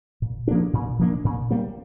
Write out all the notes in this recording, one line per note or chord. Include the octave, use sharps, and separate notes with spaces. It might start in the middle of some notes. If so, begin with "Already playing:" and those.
A#2
F3 A#3 D4
A#2
F3 A#3 D4
A#2
G3 A#3